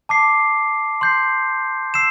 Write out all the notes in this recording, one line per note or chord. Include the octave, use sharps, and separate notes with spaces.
A5 D6 C7
C6 G6 C7
E6 C7 E7